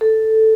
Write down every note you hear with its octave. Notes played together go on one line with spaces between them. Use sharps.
A4